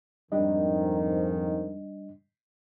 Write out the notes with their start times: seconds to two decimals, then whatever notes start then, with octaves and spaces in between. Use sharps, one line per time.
0.32 F2 G#2 D#3 G3 D4 D#5